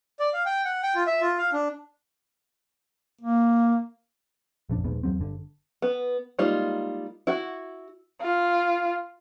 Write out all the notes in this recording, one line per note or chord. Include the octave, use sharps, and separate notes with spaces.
D5
F5
G5
F#5
G5
F4
E5
F4
F5
D4
A#3
A#1 F2 D4
D#1 A#1 G#2 B3
E2 F#3 C4
G1 D3
B3
G3 G#3 A#3 D#4 F4
E4 F#4
F4